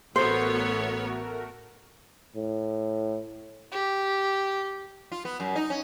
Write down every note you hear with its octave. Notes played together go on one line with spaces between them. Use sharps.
A1 A3 B3 F#4 A4 A#4 C5 C#5
A2
G4
F4
B3
F#2
D#4
C#4